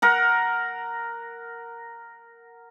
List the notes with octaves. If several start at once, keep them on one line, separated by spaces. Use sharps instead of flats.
A#4 F#5